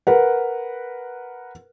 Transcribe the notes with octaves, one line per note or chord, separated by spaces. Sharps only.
A#4 B4 F#5